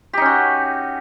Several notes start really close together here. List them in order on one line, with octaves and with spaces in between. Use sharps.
G4 D#4 C#4 F#4